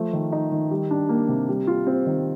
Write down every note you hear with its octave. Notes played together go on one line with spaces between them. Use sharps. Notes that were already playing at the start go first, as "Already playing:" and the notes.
Already playing: F3 A3
D#3
D#4
D#3
G3
D4
A#3
C3
G3
F4
C4
D#3